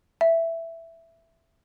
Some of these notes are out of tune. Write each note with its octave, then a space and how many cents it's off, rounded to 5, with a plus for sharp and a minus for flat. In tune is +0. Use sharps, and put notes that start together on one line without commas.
E5 +5